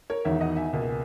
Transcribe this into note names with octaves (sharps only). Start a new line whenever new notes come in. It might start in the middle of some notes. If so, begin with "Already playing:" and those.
A#4 C#5
E1 E2 D#3 C#5 E5
D#5 F#5
E5 G#5
C#2 B2 A#3